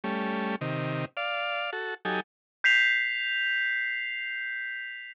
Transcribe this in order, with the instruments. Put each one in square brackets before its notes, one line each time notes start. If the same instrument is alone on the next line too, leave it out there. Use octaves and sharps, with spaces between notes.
[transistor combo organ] G3 A3 C#4
C3 D#3
D5 F5
F#4 A4
F#3 D#4 G4 A4 G#5
[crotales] G6 B6 C7 F7